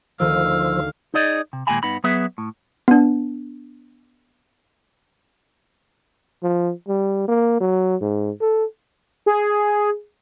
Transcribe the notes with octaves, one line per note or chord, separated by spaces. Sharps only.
D2 D#3 F3 F5 E6
D#4 G#4 D5 D#5
C3
D#2 A#2 G#3 G5 G#5 B5
G2 B3 D#4 B5
F#3 B3 G#4 B4 E5
A2
B3 D4
F3
G3
A#3
F#3
G#2
A4
G#4